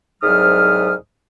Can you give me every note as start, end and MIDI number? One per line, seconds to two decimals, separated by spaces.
0.23 0.93 36
0.23 0.93 44
0.23 0.93 54
0.23 0.93 87
0.23 0.93 89